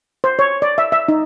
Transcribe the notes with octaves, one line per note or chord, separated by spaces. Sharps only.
C5
C#5
D5
E5
E5
D#4